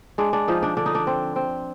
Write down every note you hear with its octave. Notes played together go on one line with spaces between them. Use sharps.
G#3 D4
D4
F3 D#4
D4
D3 D4
D#4
D4
C4
C4